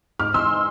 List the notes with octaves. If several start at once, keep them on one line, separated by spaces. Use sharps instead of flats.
G#2 D6 F6
E3 C6 E6